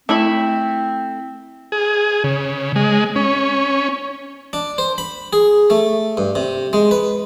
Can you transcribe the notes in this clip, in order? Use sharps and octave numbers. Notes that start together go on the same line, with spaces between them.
A3 C4 E4 B5
G#4
C#3
G#3
C#4
D4
C5
B5
G#4
A3
G2
C3
G#3
B4